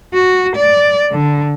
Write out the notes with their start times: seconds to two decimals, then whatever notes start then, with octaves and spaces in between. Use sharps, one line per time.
0.14 F#4
0.56 D5
1.12 D3